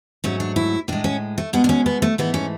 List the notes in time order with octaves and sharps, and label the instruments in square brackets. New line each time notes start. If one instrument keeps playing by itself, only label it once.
[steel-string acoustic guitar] G#2 F#3 A3 C#4
D4
E4
A2 G#3 D4
C#4
A3
B2 G#3 B3
D4
C#4
B3
A3
G#2 E3 A3 B3
C#4